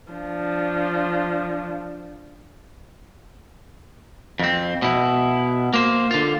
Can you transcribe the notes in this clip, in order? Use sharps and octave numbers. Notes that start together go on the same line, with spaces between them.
F3 D4
F2 C4
B2 E4
A#3 C5
D3 F4